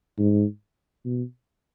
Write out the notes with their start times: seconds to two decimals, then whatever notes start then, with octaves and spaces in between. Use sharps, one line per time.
0.18 G#2
1.05 B2